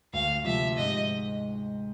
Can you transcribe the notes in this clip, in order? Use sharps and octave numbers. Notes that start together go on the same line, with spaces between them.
D2 F5
C3 F3 E5
G#2 D#5